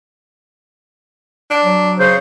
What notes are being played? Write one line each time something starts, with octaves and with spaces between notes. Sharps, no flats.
D4
F#3
C#3 C5